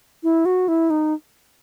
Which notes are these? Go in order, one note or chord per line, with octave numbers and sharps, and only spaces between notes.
E4
F#4
E4
D#4